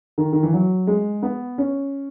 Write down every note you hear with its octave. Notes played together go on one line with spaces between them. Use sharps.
D#3
D#3
E3
F#3
G#3
B3
C#4